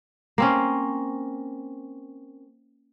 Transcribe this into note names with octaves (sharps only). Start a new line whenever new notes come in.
A#3 C4 C#4